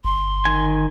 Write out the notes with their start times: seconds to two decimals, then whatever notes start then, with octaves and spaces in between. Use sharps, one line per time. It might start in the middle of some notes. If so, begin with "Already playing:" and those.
0.05 G1 C6
0.45 D#3 G#5